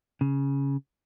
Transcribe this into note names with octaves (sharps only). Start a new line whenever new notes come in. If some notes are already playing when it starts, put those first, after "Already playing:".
C#3